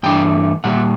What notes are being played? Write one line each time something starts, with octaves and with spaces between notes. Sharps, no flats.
G2 E3 A3 D4 G5
A#2 G3 F#5